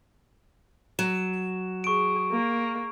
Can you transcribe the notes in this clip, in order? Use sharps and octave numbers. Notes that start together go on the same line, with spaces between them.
F#3 E7
G#4 C#6 D7
A#3